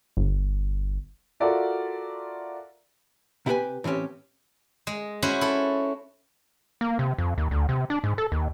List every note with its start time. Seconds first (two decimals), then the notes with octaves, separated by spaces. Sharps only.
0.17 G1
1.40 F4 F#4 A4 A#4 D5 E5
3.46 C3 E4 G4 G#4 B4 G#5
3.84 A2 E3 C4 C#4 G4
4.87 G#3
5.22 C#4 E4 F#4 C5
5.41 E4 A4
6.81 A#3
6.99 C3
7.18 F2
7.38 D#2
7.51 D2
7.69 C3
7.90 D4
8.04 G#2
8.18 A4
8.32 D#2